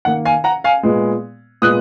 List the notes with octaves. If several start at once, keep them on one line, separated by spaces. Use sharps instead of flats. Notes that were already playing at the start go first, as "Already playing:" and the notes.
D#3 A#3 F#5
F5 G#5
F#5 A#5
F5 G#5
A#2 G#3 B3
A#2 G#3 B3 D#6 F#6